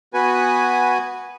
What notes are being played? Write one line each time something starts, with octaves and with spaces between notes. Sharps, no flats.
B3 F#4 B4 G#5